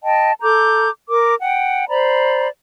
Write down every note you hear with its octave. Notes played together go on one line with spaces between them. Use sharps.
D#5 G5 A5
A4 A#5 D6 G6
A#4 D6
F#5 G5
C5 D5 A#5 B5